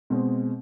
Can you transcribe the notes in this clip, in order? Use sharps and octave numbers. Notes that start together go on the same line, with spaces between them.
B2 G#3 C4